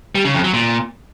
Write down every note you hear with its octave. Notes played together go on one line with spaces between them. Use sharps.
G3
C#3
F2
F#3
A#2